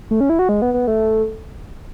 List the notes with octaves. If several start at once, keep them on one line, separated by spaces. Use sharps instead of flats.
A3
C#4
E4
F#4
G#3
B3
B3
A3